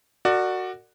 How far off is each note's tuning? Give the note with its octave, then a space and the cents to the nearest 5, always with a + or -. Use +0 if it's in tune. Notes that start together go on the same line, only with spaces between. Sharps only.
F#4 +0 A#4 -40 D5 +20